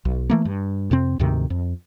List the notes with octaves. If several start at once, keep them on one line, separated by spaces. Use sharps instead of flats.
B1
E3 A3 A#3
G2
F2 C3 C4
D2 G#2 C3 D#3
F2